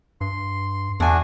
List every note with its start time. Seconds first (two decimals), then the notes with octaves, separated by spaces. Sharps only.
0.21 G2 C6
1.00 E2 B2 A3 D4 F#4 G#5